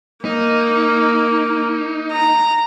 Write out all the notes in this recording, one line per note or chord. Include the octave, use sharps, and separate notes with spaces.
A#3 D#4
A#5